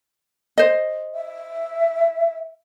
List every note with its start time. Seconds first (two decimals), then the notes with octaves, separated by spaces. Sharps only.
0.58 C5 D#5
1.14 E5